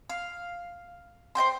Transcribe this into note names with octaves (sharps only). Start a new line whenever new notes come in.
F5
C5 D#5 G5 C6